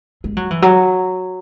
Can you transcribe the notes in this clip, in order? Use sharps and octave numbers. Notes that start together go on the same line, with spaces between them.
G#3
F#3
E3
F#3